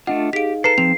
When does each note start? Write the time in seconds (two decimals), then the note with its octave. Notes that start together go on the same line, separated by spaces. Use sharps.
0.07 A3 D4 F4 D#5 F#5
0.33 D#4 G4 G#4 F5 B6 D7
0.64 A4 B4 A#5 C7 E7
0.78 F3 C4 F7